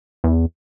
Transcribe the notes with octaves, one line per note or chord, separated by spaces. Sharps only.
E2